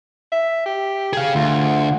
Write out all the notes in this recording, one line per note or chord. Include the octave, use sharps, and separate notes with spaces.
E5
G4
G#4 F5
D2 F4